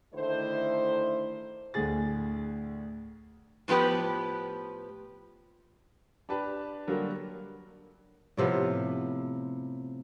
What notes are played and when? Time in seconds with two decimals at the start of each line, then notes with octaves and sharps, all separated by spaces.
0.14 D3 D#3 A3 E4 C5
1.74 D2 A2 D3 G#4 A6
3.68 A2 F3 B3 G4 B4
6.29 D4 G4 B4 A5
6.87 D3 F#3 G3 A#3 F#4 A#4
8.37 A2 C3 F3 B3